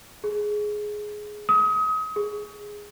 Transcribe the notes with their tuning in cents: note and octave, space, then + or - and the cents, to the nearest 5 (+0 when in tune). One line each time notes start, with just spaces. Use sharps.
G#4 +10
D#6 +30
G#4 -5